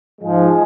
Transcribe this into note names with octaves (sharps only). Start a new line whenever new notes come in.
G#2 F3 G#3 G#4